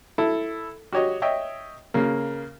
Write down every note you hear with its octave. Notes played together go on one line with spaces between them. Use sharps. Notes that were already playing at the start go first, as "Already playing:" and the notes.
E4 A4
F#4 G4 C#5 D#5
C#5 D#5 E5 G5
C#3 A#3